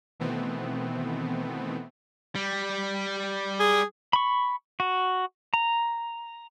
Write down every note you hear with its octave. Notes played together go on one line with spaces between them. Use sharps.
B2 D#3 E3 A3 B3 C4
G3
G#4
B5 C#6
F#4
A#5